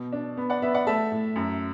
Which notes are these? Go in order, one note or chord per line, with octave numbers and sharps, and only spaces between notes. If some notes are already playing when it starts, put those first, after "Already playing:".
Already playing: B2
D4
B3
D5 F#5
B3 B4 E5
D5 F#5
A3 E5 A5
A2
F#2